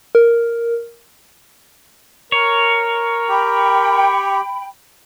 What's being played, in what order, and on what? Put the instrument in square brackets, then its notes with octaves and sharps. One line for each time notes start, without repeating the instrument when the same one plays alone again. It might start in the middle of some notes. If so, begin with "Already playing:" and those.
[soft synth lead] A#4
[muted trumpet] A#4 [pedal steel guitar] C#5
[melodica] G4 [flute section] G5 B5